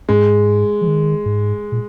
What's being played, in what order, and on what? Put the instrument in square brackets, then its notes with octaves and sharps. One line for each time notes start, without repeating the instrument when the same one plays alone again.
[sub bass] G#2 [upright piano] G#3
[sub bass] F3
D#3
G#2
A#2